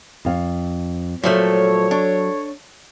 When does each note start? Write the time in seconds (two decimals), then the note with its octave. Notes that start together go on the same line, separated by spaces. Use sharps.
0.25 F2 F5
1.24 A#2 F3 F#3 A3 A4 C#5
1.91 D4